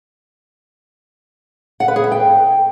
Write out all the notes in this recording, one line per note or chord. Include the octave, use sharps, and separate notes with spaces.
F#5
B4
G#4
E5
G5